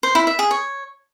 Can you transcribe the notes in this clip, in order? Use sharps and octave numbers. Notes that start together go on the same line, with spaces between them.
C5
E4
E5
G#4
C#5